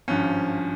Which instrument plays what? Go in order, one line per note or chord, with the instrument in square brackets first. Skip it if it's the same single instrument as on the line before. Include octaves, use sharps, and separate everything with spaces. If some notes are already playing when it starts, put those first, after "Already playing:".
[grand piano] G#1 G2 F3 C#4